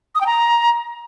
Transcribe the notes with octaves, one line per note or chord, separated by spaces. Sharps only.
D#6
G5
A#5